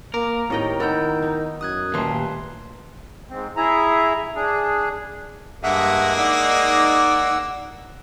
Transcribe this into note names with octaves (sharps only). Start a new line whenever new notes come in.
A#3 A#4 D6
D#2 A2 C4 D#5 G5
D#3 B3 E4 E6 G6
D#4
F#2 D#6 F#6 G#6
D#2 A#2 G3 A3 B4 C6
G#2 C4
E4 G#4 E5 A#5
D4 G#4
G2 G#3 A#3 E5 F#5
D#4 D5 F#5 E6